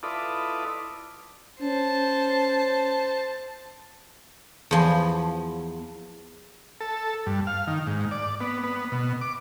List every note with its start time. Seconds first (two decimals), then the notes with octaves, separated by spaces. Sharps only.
0.03 E4 F4 A4 B4 D5 D#5
1.61 C#4 C5 A5
4.71 E2 F3
6.81 A4
7.26 G2
7.47 F5
7.67 D#3
7.87 G#2
8.11 D5
8.40 B3
8.64 B3
8.92 B2
9.21 D6